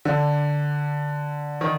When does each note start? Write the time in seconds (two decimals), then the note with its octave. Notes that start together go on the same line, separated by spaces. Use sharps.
0.05 D3
1.61 D#3